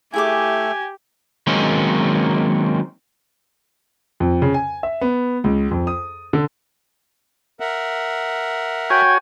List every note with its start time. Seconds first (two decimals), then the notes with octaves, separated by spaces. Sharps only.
0.14 A3 E4 G4 G#4 G#5 D6
1.47 D#3 F#3 G#3 A#3 C4 C#4
4.20 F2
4.42 C#3
4.54 G#5
4.83 E5
5.01 B3
5.44 C#2
5.71 F2
5.87 D#6
6.33 D3
7.60 A#4 E5 F#5
8.90 F#4 C#5 G5 G#5